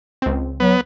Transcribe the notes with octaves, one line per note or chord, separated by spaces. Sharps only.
C#2 C4
F#3 B3